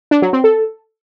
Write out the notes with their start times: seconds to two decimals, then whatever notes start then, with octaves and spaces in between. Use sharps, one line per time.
0.11 D4
0.22 F#3
0.33 C4
0.44 A4